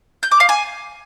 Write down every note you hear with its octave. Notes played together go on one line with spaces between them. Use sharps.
G6
D6
F5
G#5